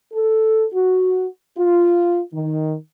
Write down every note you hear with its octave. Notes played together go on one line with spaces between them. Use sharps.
A4
F#4
F4
D#3